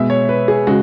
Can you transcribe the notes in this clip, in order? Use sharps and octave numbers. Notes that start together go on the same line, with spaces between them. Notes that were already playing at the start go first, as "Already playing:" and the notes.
Already playing: B2 G#3 E5
C#5
B4
G#4
C#3 G#3 F#4